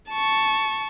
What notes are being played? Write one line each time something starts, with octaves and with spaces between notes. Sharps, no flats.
A5 C#6